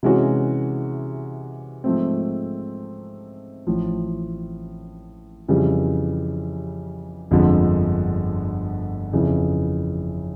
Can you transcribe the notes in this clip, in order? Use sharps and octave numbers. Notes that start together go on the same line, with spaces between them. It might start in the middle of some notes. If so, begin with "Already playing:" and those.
C3 E3 G#3 C#4 F#4
G#2 F3 A3 C4
A1 A2 F3
F2 C#3 E3 G3
G1 F2 D3 F3 G#3
F2 C#3 E3